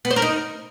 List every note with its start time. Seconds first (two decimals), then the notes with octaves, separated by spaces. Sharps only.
0.05 B3
0.11 C5
0.16 A#4
0.22 D#4